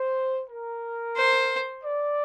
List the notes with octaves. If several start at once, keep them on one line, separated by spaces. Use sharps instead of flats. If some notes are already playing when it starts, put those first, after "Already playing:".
Already playing: C5
A#4
C5
D5